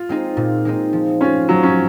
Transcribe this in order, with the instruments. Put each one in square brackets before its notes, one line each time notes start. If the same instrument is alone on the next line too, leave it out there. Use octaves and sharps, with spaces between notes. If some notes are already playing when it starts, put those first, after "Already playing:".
Already playing: [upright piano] F4
[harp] G#3 C4 D#4
A#2
G#3 C4 D#4
F3
[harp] C4 F4 [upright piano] C#4
[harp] F3 [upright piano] F#3
[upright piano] C#4